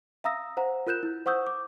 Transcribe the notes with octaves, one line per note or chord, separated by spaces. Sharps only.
E5 F5 A#5 D#6 E6 A#6
C5 F#5 A#5
F4 A#4 F#6 G6 E7
E4
C5 F#5 C#6 D#6 E6 G6
D6